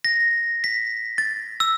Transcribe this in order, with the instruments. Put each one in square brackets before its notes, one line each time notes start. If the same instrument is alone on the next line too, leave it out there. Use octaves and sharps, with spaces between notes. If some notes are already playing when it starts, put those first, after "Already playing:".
[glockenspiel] A#6
B6
A6
E6